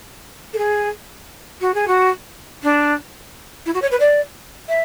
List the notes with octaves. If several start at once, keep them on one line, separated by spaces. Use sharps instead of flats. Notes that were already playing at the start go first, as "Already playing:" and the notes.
A4
G#4
F#4
G#4
F#4
D4
E4
F#4
C#5
B4
D5
E5